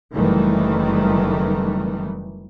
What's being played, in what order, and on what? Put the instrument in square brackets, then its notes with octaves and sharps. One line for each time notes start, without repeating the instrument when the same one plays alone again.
[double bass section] F#1 D#3 E3 G3 A3